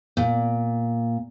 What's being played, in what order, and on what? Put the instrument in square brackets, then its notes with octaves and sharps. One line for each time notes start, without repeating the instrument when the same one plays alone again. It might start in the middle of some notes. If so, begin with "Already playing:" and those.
[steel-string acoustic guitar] A#2